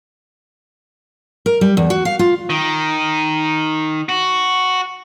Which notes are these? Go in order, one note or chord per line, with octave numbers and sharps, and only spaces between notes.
A#4
G3
E2
F#4
F5
F4
D#3
F#4